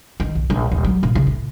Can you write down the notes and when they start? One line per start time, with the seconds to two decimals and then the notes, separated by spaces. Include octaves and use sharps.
0.20 D#3
0.35 A#1
0.50 A#1
0.72 D#1
0.84 F#3
1.03 A#2
1.15 C#3
1.27 A2